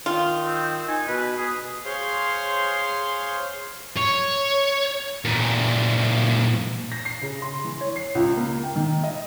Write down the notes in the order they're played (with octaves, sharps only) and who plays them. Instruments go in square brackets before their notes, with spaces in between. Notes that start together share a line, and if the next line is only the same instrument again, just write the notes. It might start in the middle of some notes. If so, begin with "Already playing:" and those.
[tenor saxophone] D#3 [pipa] F4
[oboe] C4
[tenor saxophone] D#4 [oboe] G#5
[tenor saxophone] B2 [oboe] B4
[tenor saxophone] B2 [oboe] G#4
[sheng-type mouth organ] G#4 C5 C#5 F5 C6
[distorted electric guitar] C#5
A#2 E3
[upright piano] A#6
C7
C#3
C6
E3
C#5
C7
C#2
A#3
G5
D#3
D#5